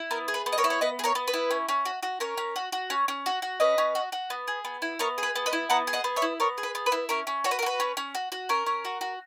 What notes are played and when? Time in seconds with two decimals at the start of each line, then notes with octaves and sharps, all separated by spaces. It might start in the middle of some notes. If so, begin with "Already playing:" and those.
Already playing: E4
0.11 B3 A#4
0.28 G#4
0.34 B4
0.46 B3
0.53 D#5
0.58 A#4 C#5
0.64 E4
0.70 C#5
0.81 B3 B4 D#5
0.99 G#4
1.04 A#4 C#5
1.15 B3
1.28 B4
1.34 E4
1.51 C#4
1.69 C#4
1.85 F#4
2.03 F#4
2.20 C#4 A#4 C#5
2.37 C#4
2.56 F#4
2.72 F#4
2.90 C#4
3.08 C#4
3.26 F#4
3.42 F#4
3.60 C#4 B4 D#5
3.78 C#4
3.95 F#4
4.12 F#4
4.30 B3
4.48 G#4
4.65 B3
4.82 E4
4.99 B3 A#4 C#5
5.18 G#4
5.23 B4
5.35 B3
5.46 B4 D#5
5.53 E4
5.70 B3 F#5 A#5
5.87 G#4
5.93 D#5 F#5
6.04 B3
6.16 C#5 E5
6.22 E4
6.40 B3 A#4 C#5
6.58 G#4
6.63 B4
6.75 B3
6.86 B4
6.92 E4
7.09 C#4 A#4
7.27 C#4
7.44 F#4 C#5
7.51 B4
7.59 A#4
7.62 F#4 B4
7.80 C#4
7.97 C#4
8.15 F#4
8.32 F#4
8.49 C#4 A#4
8.66 C#4
8.85 F#4
9.01 F#4